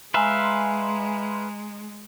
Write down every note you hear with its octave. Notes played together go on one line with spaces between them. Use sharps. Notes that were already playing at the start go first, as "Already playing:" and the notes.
G#3 B4 E5 F5 G#5 A#5 C6